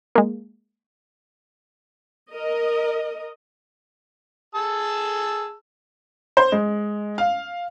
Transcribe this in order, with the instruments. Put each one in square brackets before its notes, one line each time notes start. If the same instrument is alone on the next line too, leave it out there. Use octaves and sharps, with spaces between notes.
[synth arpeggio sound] G#3 A#3
[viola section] A#4 D#5
[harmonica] G#4 A5 E6
[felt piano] C5
G#3
F5